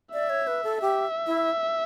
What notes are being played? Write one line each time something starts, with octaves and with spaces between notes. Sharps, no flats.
D5 E5
C#5
B4
A4
G4 E5
E4